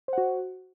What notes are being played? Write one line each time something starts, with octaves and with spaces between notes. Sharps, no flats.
F#4 C5 F#5